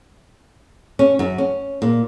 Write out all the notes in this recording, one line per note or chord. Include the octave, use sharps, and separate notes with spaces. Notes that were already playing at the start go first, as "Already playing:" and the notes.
C#4
F#2
C#4
A#2